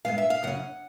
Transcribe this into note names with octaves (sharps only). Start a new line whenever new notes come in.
G2 E3 G#3 B3 F5
E5
F5
F#2 C#3 C#4 F#5